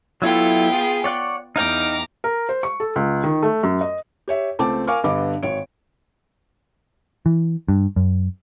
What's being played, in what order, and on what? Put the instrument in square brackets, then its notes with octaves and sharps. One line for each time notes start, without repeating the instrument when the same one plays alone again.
[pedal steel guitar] F#3 E4 A4 [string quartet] B3 F4 G5
[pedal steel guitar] G#4
C#5 D5 F#5
[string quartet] E2 A#5 D6 [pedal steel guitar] D#4 F5 G5
[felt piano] A#4
C5
C#6
A4
C#2
D#3
A3
F#2
D#5
G4 C#5 E5
C#2 A3 C4 A5 D6
A#4 F5 G#5 C#6 D6 F6
G2 D3 B3 D#5 D6
G#1 C#5 D7
[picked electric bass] E3
G2
F#2